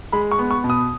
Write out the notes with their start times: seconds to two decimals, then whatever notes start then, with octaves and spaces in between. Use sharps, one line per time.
0.12 G#3 B5
0.32 C#6
0.39 B3
0.51 C#6
0.64 B2
0.70 D#6